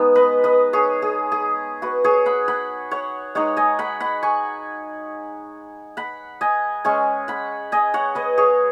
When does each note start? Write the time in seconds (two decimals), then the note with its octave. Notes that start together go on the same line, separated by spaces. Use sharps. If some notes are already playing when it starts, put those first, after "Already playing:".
Already playing: G#3 B3 D#4
0.15 B4 D#5
0.44 B4 D#5
0.73 G#4 C#5
1.02 G#4
1.32 G#4
1.82 F#4 B4
2.04 G#4 C#5
2.26 F#5 B5
2.48 F#5 B5
2.91 C#5 F#5
3.35 G#3 D#4 C#5 F#5
3.57 D#5 G#5
3.79 F#5 B5
4.00 F#5 B5
4.23 G#5 C#6
5.97 F#5 B5
6.41 D#5 G#5
6.85 G#3 C#4 G#5 C#6
7.28 F#5 B5
7.72 D#5 G#5
7.94 C#5 F#5
8.15 B4 D#5
8.38 G#4 C#5